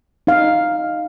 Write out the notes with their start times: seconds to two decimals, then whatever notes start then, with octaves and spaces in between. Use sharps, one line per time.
0.27 D#4 F5